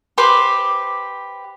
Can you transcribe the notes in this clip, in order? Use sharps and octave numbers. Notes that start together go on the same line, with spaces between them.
G4 B4 C5 D6